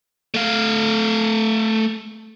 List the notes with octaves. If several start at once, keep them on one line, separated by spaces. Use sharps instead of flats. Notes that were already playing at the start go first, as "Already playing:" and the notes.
A3 F5